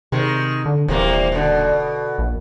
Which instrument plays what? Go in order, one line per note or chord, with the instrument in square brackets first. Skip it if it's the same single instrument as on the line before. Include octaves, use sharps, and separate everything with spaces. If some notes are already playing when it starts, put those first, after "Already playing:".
[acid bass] C3 [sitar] D#3 G#3
[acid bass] D3
[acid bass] D#1 [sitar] E2 C3 A#3
[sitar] B2 D3
[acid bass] A#1